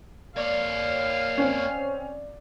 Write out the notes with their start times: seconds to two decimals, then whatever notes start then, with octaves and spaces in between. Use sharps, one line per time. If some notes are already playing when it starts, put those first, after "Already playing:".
0.37 A#3 C#5 D5 F5
1.38 C4 C#4